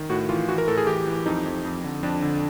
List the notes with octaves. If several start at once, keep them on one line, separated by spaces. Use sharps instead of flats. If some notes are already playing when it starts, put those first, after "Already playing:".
Already playing: D#3
A2 F#4
E3 F4
E3 F#4
A#4
A2 A4
G#4
E3 G4
E3
F2 D#4
F2
F2
D3
F2 D4
D3